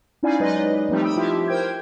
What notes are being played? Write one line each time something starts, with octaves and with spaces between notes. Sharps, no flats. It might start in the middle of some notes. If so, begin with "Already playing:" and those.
C#4 D#4 E4 D5 F5 G#5
F#3 G#3 D#4 B4 D5 D#5
F3 G3 A3 C4 D#4 G4
G5 B5 D#6 E6
F3 E4 F4 G4 E5
A#4 C5 G5 G6 G#6